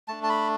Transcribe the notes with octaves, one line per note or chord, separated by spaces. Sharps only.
A3 D4 A5
A5
B5